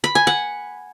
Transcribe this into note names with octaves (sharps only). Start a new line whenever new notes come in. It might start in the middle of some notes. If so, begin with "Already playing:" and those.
B5
G#5
F#5